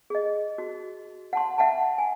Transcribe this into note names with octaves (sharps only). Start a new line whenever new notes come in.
G#4 D#5
F#4
F#5 A5 C6
E5 F#5 G5 A5 A#5
G#5